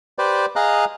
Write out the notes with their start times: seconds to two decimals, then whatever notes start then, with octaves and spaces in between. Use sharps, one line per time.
0.19 G4 B4 C5 D5
0.56 G#4 D#5 F5 A#5 F#6